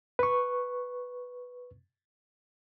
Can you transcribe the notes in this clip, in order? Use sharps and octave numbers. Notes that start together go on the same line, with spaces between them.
B4 C#6